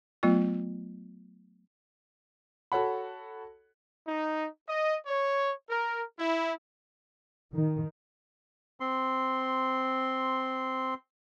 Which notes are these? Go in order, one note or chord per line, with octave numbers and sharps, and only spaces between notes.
F#3 A3 B3 F4
F#4 A4 C#5 F#5 B5
D#4
D#5
C#5
A#4
E4
D#3
C4 C6